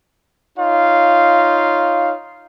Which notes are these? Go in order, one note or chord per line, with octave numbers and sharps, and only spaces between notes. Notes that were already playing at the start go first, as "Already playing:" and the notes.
D#4 F4 C#5 F5